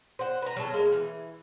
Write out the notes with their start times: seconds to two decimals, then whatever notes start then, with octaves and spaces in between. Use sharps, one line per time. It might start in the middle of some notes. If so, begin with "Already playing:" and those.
0.19 C5 F#5
0.42 B4 A#5
0.56 F#3 G#4 A4
0.73 G#3 A#3
0.92 E3